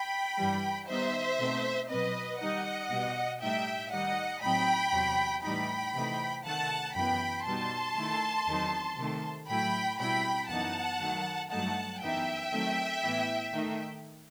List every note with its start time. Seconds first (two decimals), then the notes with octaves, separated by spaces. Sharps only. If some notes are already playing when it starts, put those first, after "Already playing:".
Already playing: G5 B5
0.38 G2 E3 G3
0.88 D#3 G3 B3 D#4 C5 E5
1.39 B2 A3 C4 D#4
1.89 B2 F#3 C4 B4 D#5
2.41 D#3 G3 D#4 D#5 F#5
2.91 B2 G3 B3
3.41 A2 G3 D#4 E5 G5
3.92 D#3 G3 D#4 D#5 F#5
4.43 A2 F#3 C4 D#4 G5 B5
4.93 E2 C3 F#3
5.44 A2 E3 G3 D#4 G5 B5
5.95 C3 E3 A3 D#4
6.45 C3 D#3 A3 F#5 A5
6.95 F#2 E3 B3 G5 B5
7.46 B2 G3 B3 D#4 A5 C6
7.97 D#3 A3 E4
8.47 E2 D#3 F#3 C4 D#4
8.98 C3 D#3 A3
9.48 A2 F#3 A3 E4 G5 B5
9.99 B2 G3 C4 E4 G5 B5
10.50 F#2 E3 B3 D#4 F#5 A5
11.00 D#3 F#3 A3
11.50 G2 F#3 A3 D#4 F#5 A5
12.01 F#2 E3 B3 D#4 E5 G5
12.52 D#3 F#3 A3 C4
13.03 A2 E3 B3 E4
13.54 D#3 A3 D#4